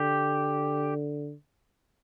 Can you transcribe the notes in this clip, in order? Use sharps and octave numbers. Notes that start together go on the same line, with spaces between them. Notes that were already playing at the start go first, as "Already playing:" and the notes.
Already playing: D3 G4